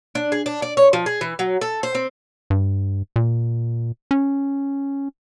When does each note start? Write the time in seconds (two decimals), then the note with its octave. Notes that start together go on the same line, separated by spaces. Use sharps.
0.15 D4
0.32 G#4
0.46 D4
0.62 D5
0.77 C#5
0.93 F3
1.06 G#4
1.21 E3
1.39 F#3
1.61 A4
1.83 C5
1.95 C4
2.50 G2
3.16 A#2
4.11 C#4